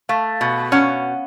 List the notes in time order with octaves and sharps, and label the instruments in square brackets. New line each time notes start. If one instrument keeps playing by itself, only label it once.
[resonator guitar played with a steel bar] A3 [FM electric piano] F5
[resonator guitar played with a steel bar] B2
[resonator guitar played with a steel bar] C#4 [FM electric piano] F#5